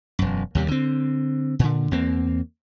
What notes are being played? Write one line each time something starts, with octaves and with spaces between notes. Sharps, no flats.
E1 F#2
D#2 C3 G3
D3 C4
A#2 D3
E2 A#3 C4